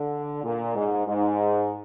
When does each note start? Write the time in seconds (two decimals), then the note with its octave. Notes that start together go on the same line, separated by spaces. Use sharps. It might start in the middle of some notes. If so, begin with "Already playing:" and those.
Already playing: D3
0.44 A#2
0.75 G#2
1.07 G#2